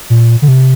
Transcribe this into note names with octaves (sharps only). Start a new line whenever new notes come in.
A#2
D3
C3